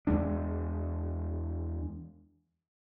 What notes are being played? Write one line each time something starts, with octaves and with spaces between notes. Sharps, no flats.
E2 G#3 D4